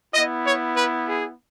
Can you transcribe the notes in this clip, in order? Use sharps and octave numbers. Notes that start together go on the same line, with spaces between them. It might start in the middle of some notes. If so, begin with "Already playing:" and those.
B3 E4 D#5
C#5
B4
G#4